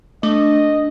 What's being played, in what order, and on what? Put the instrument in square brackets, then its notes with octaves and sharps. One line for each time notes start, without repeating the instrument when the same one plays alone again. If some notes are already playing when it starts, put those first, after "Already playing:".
[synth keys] A3 [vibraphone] D4 [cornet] D#5